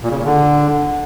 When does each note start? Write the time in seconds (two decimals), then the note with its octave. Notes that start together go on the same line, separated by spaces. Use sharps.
0.03 A#2
0.10 C#3
0.18 A#2
0.25 D3